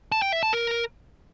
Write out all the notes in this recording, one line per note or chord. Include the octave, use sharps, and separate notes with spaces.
A5
G5
E5
A5
A#4